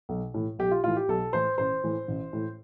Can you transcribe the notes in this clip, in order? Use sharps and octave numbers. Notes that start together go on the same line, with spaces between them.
B1
A2 E3
B1 G4
F4
A2 E3 F4
G4
B1 A4
A2 E3 C5
A1 C5
A2 E3
A1
A2 E3